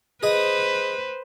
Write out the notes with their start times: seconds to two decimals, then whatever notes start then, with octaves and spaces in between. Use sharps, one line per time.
0.23 G#4 B4 C5 D#5